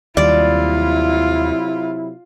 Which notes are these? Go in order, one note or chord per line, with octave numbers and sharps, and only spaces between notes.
D#2 C3 F#3 G3 E4 F4 D5